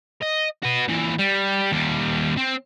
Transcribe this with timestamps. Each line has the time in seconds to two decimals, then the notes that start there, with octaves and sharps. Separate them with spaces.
0.23 D#5
0.63 F#4 B4
0.88 A#2 E3
1.19 G3
1.72 D#2 G3
2.37 C4